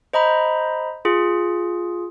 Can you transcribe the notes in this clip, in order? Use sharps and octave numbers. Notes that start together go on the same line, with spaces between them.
C5 D#5 A#5 B5
F4 G#4